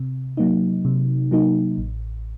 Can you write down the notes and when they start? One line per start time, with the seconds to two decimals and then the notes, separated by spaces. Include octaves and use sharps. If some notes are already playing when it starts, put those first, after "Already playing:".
Already playing: C3
0.37 F#3 A#3 D#4
0.85 C3
1.31 F#3 A#3 D#4
1.78 A1